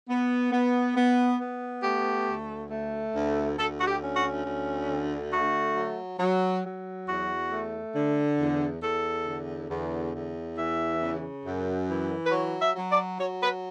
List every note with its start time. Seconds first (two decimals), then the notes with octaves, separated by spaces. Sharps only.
0.08 B3
0.52 B3
0.96 B3
1.39 B3
1.83 A3 G4
2.27 D2
2.70 A3
3.14 D2
3.57 D2 A4
3.80 F#4
3.87 G4
4.01 C#4
4.16 F#4
4.45 D2
4.89 D3
5.32 A3 F#4
5.76 F#3
6.19 F#3
6.64 F#3
7.07 E2 F#4
7.51 A3
7.95 D3
8.38 E2
8.82 E2 A4
9.26 D3
9.70 E2
10.14 E2
10.57 E3 E5
11.01 C#3
11.44 F#2
11.89 E3
12.25 B4
12.32 F#3 C#5
12.61 E5
12.75 F#3
12.90 D5
13.19 F#3 C#5
13.42 B4